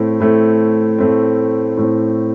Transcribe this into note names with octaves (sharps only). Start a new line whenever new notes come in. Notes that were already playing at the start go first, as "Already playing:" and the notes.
Already playing: A2 A3 C4
A2 A3 C4
A2 A3 C4
A2 A3 C4